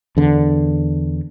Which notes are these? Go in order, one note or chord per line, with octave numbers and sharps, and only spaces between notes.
E2 D3